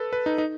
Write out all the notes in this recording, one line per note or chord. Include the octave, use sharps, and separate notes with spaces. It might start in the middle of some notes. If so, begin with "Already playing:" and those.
Already playing: A4 B4
B4
D#4
D#4